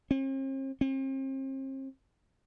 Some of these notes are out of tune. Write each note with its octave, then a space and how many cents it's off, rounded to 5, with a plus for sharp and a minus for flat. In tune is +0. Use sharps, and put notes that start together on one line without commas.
C4 +45
C4 +40